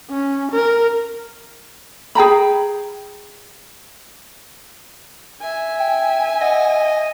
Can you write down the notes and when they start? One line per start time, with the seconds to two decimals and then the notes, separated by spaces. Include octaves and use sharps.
0.10 C#4
0.52 A#4
2.15 G#4 G5 A#5 B5
5.41 E5 G#5
5.79 G5
6.41 D#5 F#5